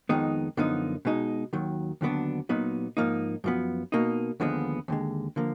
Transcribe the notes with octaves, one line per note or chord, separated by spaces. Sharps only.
F2 D#3 G#3 B3 D#4
F#2 D3 F3 B3 D#4
B2 G#3 D#4
D#2 D#3 F#3
D#2 D3 F#3 B3 D4
A#2 F#3 B3 D#4
G#2 F3 A#3 D#4
F#2 F3 B3
B2 A#3 D#4
D#2 D3 F3 G#3 B3
D#2 D3 G#3
D3 F3 A#3